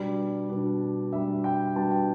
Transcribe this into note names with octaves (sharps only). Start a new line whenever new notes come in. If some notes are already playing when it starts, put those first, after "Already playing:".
Already playing: B2 G3 D4 D5
B2 G3 D4
B2 G3 D4 E5
G5
B2 G3 D4 A5
G5